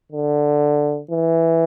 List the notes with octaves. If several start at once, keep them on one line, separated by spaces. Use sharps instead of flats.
D3
E3